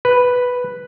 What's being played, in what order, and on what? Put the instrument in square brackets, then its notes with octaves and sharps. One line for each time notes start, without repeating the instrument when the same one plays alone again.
[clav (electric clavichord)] B4